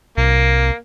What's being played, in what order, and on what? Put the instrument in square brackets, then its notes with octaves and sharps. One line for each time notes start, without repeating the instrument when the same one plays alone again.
[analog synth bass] C2 [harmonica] A#3